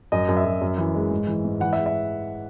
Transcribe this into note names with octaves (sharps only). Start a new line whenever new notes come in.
F#2 D#5
F#2
E5
F#2
F#2
E3
G#3
G#2
E3
G#2
E3 F#5
E5
G#3
E5